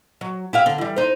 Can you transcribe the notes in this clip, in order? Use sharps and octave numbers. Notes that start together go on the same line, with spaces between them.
F#3
E4 G4 F5
D3
E3 G3
D#4 C5